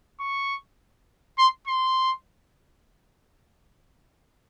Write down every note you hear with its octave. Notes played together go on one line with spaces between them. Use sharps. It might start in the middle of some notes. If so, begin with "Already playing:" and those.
C#6
C6
C6